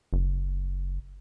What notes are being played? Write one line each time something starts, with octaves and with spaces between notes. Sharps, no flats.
F#1